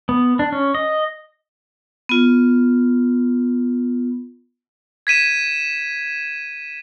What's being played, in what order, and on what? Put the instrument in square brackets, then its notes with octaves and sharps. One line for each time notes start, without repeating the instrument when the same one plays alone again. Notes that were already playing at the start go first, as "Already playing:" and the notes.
[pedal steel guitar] B3
D4
C#4
D#5
[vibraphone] B3 F4
[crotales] G#6 B6 D#7 E7